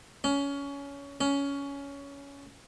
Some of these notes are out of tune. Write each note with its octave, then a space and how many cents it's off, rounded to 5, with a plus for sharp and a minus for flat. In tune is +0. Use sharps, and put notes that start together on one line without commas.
C#4 +20
C#4 +15